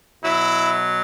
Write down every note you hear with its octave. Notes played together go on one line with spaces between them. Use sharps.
B2 F#3 E4